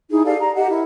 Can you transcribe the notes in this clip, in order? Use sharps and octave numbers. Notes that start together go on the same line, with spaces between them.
D#4 E4 G#4
G4 A4 D5 F5
A#5
G4 D#5 F#5
E4 A#4